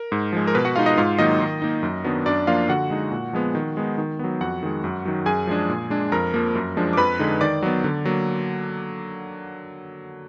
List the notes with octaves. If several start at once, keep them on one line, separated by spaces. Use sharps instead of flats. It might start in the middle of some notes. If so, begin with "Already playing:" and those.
Already playing: A#4
G#2
F3 G#3
A#4
B2 B4
F#4 F#5
G#3 D#4 F4 F5
D#4 D#5
G#2 F4 F5
D#3 F#3 A#3 D#4 D#5
D#3
A#3 D#4
F#2
D#3 F#3 B3 D4
F#2 D4 D5
F3 A#3 D4 F4 F5
D3 F#4 F#5
G#3 D#4
A#2
F3 G#3 B3
D#3
G#3 B3 D#4
D#3
F#3 B3
F2 F#4 F#5
D#3 G#3
F#2
D#3 F#3
F#2 G#4 G#5
F3 G#3 D4
A#2
G#3 D4
F2 A#4 A#5
F3 A#3
F#2
F3 G#3 D4
D6
F2 B4 B5
D3 G#3 D#4
D#3 D5 D6
F#3 B3
D3
F#3 A#3